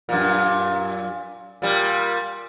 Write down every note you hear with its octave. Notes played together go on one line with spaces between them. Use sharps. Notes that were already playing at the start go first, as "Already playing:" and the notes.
F#2 A#2
A#2 G3